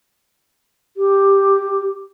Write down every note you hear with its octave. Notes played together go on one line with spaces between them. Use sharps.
G4